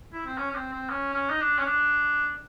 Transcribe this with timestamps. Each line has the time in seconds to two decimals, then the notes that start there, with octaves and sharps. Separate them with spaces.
0.13 E4
0.26 C4
0.38 C#4
0.50 C#4
0.55 C4
0.73 C4
0.89 C#4
1.14 C#4
1.30 D#4
1.40 D4
1.58 C#4
1.65 D4